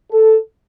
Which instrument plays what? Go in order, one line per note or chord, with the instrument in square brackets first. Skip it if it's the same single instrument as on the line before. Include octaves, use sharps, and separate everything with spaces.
[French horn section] A4